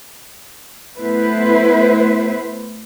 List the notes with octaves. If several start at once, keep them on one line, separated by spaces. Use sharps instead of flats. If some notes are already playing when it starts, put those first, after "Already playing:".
A3 B3 E4 B4 C5